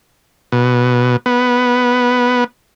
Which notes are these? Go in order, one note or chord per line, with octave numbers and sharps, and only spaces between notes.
B2
B3